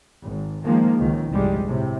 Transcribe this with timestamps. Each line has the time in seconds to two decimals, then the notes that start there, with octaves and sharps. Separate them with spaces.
0.23 G#1
0.64 D#3 F3 G#3 A#3
0.99 C#2 D#3
1.30 G1 C2 F2 G3 G#3
1.65 A2 C3